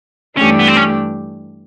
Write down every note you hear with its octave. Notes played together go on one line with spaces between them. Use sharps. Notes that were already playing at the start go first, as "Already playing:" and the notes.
G2 E3 A3 C#4 D4 G4
B3
C4
C#4